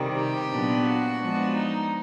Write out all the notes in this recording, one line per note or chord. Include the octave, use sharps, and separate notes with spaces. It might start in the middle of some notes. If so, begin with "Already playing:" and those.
Already playing: C3 D#3 G3
G4
A#2 F#3 B3 D4
F#4
F3 G#3 B3 D4
D#4